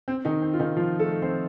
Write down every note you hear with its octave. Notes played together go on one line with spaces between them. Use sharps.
C4
D#3 D#4
C4
F4
D#3 D#4
F3 F4
A3 A4
C4 C5